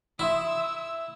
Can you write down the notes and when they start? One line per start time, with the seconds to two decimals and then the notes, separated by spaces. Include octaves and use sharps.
0.19 E4 E5 C6 D#6 E6